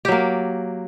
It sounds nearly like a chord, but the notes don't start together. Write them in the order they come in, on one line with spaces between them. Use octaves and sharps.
G4 F#3 A#3